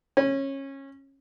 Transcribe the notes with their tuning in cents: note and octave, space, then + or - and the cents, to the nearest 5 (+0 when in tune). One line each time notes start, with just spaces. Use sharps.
C#4 -20